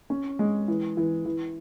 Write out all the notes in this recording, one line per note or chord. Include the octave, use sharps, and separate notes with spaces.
C#4
G#3
E3
E3
E3